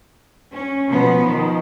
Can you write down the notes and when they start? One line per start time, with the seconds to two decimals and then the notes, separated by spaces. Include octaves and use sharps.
0.52 C#4
0.88 B2 F3 B3
1.21 D#3 F3